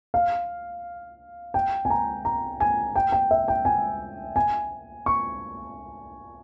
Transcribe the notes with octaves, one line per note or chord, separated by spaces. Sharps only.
F5
G5
G#5
A#5
A#5
G#5
G5
G5
E5
G5
G#5
G#5
C#6